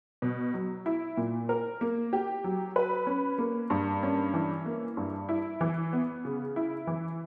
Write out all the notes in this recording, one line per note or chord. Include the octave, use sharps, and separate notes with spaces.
B2
F#3
E4
A#2
A#4
A#3
G4
F#3
B4
C#4
A#3
G2
C#4
E3
A#3
G2
E4
E3
B3
C#3
E4
E3